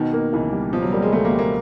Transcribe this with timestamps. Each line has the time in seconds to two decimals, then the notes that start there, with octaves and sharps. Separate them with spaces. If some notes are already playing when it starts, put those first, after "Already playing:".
Already playing: B2 D#3
0.13 A#3
0.33 C#2 E3
0.52 G3
0.72 B2 F3
0.82 F#3
0.92 G3 A#3
1.02 G#3
1.12 C#2 A3
1.25 A#3
1.32 G3
1.39 A#3